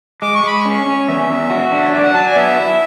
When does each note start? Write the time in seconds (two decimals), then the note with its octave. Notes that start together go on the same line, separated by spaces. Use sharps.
0.22 G#3 D6
0.35 C#6
0.43 G#3 B5
0.59 C#6
0.65 C#4
0.86 C#4
1.08 E2 E5
1.30 E2
1.50 F#4
1.72 D4
1.84 C#5
1.93 F#3 D5
2.03 F#5
2.14 F#3 A5
2.26 G#5
2.32 D5
2.36 B3 E5
2.57 E4